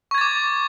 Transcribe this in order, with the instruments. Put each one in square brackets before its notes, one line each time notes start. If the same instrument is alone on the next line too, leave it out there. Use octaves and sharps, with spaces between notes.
[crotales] C#6
G#6
A6
D6